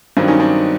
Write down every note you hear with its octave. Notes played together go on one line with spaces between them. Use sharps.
G2 D#3 F#3 C4 D4
C#4 D#4
C4 D4